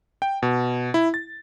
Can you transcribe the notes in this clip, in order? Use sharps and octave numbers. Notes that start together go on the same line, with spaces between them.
G5
B2
E4
A6